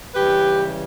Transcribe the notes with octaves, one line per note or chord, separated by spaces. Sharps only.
C#3 E3 G3 G4 B4